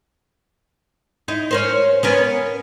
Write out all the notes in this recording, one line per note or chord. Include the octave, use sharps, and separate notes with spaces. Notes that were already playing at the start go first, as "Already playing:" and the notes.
D#4 E4
C#4 A#4 C5
B3 C#4 A#4